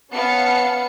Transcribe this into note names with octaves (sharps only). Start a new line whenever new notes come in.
B3 C#4 F5 A5 C#7